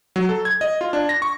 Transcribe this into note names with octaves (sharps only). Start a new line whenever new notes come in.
F#3
A4
G#6
D#5
F4
D4
A#6
C#6